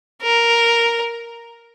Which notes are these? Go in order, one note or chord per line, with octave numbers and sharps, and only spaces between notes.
A#4